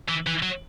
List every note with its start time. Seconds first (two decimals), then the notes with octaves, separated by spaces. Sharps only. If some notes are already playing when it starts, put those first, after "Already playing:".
0.09 E3
0.27 E3
0.43 F#3